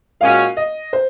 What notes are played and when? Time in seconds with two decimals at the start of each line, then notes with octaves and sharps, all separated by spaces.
0.20 A#2 G#3 C#4 F#4 F5
0.57 D#5
0.93 C5